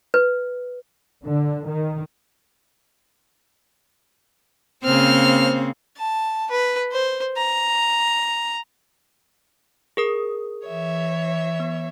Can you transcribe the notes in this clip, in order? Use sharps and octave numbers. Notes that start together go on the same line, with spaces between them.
B4
D3
D#3
C#3 A#3 C4 C5 F6
A5
B4
C5
A#5
G#4 A#4 D#6
E3 C#5 E5
B3